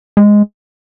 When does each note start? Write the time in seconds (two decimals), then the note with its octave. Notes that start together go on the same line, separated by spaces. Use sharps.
0.17 G#3